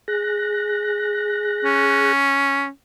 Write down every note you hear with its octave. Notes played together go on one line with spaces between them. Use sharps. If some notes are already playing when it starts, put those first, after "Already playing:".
G#4 F#6 A#6
C#4